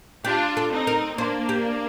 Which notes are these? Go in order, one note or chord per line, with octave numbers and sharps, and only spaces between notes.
D4 F4 G4
A4
C4 D#4
A#4
A#3 D4 C5
G4